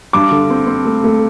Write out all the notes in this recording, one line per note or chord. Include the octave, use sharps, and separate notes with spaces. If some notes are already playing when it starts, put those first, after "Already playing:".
G2 D6
D3
C4
C4
A3
A3